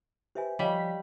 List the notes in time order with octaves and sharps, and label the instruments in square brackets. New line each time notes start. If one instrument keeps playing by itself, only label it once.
[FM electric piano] G4 B4 [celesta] C5 E5 G#5
[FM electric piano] F3 C#5 B6 [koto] G3 [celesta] D#5 F5